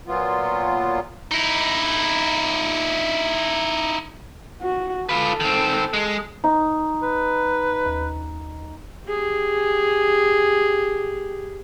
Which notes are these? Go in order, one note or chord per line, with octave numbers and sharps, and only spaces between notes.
A#2 F#3 B3 F4
D#4 E4
F#4
F4 A4 B4
D#3 C4
G#3
D#4
B4
D#2
G4 G#4